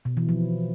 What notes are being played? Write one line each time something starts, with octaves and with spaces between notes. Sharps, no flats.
B2
E3
F3